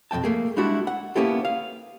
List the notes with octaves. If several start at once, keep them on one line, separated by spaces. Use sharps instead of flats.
B1 F2 A3 G5 A5
A3 A#3 G#4
G3 G#3 D4 E4 F#4 E5
F#5
A#3 B3 C#4 E4 G4 A4
F5